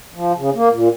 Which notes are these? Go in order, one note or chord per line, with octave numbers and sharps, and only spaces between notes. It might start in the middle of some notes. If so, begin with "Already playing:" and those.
F3
C#3
A#3
A#2